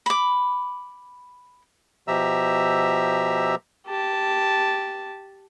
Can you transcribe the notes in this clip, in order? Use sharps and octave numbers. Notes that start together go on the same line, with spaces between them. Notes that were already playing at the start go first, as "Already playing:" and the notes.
B5 D6
B2 F3 G4 E5 A#5 E6
G4 A5